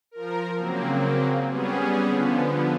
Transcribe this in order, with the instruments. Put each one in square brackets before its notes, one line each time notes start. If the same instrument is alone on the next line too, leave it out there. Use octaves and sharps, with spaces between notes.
[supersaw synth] F3 A#4
C#3 F#3 A#3 C4
G3 B3 C#4 G#4
D3 F3 B3